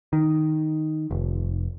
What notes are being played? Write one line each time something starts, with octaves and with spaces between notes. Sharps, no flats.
D#3
F1